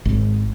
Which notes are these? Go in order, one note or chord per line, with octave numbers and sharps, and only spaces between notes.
G#1